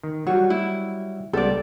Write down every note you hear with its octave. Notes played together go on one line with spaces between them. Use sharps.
D#3
F#3 G3 F#4
E4
C#2 G3 B3 A4 D5